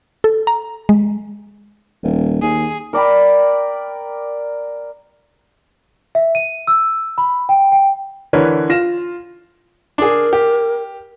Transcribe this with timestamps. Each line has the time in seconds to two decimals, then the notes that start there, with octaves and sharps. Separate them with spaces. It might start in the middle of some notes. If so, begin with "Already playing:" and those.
0.24 A4
0.47 A#5
0.89 G#3
2.03 D#1
2.42 D#2 G#4
2.93 A#4 D5 G5 B5
6.15 E5
6.35 D#7
6.67 E6
7.18 B5
7.49 G5
7.72 G5
8.33 D3 E3 D4 A#4 B4 C#5
8.69 F4 A#6 E7
9.98 D4 G#4 A#4
10.33 G4